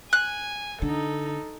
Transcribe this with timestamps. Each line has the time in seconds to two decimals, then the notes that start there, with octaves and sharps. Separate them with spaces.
0.13 G#5 F#6
0.82 D3 D#4 A4